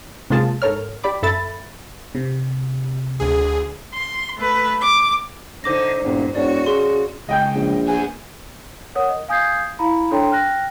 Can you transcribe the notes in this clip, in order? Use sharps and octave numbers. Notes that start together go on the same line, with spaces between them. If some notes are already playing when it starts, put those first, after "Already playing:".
C3 G#3 A#3 F4 G#4 A5
G#2 A4 A#4 C#5 F6
G4 D5 B5 D6
F#2 A4 E5 B5 A6
C3
D2 G#4
C6
A3 B4
D6
D3 D#4 C5 D6 A#6
E1 G2 A#2
E1 F#4 C#5 D5
C#3 C6
C#2 D#5 G5 G6
A#1
B3 G#4 G#5
A#4 C#5 F#5 D#6
D#5
F5 G#5 D#6 G6 G#6 C7
E4 F5 A#5 B5
D4 A4 C#5 G5 A#5 C6
G5 F6 F#6 A#6